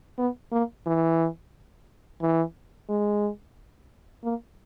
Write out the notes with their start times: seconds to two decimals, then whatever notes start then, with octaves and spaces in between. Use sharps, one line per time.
0.18 B3
0.52 A#3
0.87 E3
2.22 E3
2.89 G#3
4.24 A#3